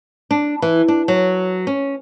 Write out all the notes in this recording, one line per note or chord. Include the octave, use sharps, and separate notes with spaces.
D4
E3
D4
F#3
C#4